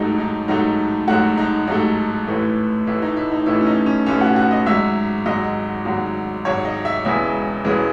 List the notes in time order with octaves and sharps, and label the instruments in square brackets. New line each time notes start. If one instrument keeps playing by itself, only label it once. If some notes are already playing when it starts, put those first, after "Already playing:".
Already playing: [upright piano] A1 G#2 F#3 A3 D#4
D#4
A1 G#2 F#3 A3 D#4
A1 G#2 F#3 A3 F#4
D#4
A1 G#2 F#3 A3 D#4
A1 A2 E3 A3
A1 A2 E3 A3 E4
D#4
E4
D#4
A1 A2 E3 A3 E4
C#4
D#4
C#4
A1 A2 E3 A3 C#4
F#4
F#4
D#5
G#1 G#2 F#3 E5
G#1 G#2 F#3 D#5
G#1 G#2 F#3
G#1 G#2 F#3 C#5
D#5
E5
E1 E2 C#3 E3 G#3 E5
E1 E2 C#3 E3 G#3